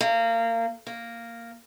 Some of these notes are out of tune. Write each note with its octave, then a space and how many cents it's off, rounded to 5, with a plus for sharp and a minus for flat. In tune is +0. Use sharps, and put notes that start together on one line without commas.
A#3 -25
A#3 -5